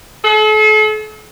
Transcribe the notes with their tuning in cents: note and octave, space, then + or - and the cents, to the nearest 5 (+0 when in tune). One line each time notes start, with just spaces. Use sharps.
A4 -40